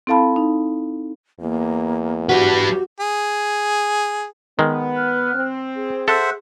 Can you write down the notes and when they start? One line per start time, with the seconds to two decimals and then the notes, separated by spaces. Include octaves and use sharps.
0.07 C4 E4 A4 F5 A5 B5
0.36 D#4
1.41 E2 A#3
2.29 G3 F#4 G4 B4
3.00 G#4
4.59 D#3 G#3 B3
4.96 F6 F#6
5.35 C4
5.75 G#4
6.08 A4 C5 E5 F#5